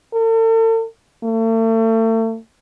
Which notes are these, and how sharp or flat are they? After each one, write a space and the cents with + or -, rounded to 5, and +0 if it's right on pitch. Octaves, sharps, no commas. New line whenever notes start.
A4 +45
A3 +40